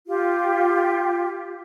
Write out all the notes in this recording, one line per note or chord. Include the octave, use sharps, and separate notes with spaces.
F4 G4